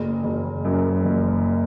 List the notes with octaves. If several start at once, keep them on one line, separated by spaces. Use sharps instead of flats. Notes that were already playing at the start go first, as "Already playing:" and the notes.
Already playing: F#1
F#1
F#2
F#1